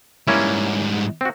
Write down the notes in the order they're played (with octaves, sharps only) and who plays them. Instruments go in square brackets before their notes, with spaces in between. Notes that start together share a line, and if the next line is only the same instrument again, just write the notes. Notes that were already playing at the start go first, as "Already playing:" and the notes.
[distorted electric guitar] G#2 G3 [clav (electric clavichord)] A#3 C#4 E4
[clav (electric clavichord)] C4 F#4